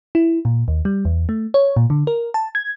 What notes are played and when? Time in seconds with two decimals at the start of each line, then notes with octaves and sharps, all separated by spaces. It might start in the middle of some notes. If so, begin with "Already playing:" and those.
0.15 E4
0.45 A#2
0.68 D#2
0.85 G3
1.05 E2
1.29 A3
1.54 C#5
1.76 A#2
1.90 D3
2.07 A#4
2.34 A5
2.55 G#6